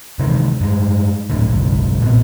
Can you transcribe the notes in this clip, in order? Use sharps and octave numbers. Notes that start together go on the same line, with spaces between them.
C3 D#3 E3 G#3
G2 G#3
D#1 A2 D3
F#1 B1 G#2
A#2 B3 C4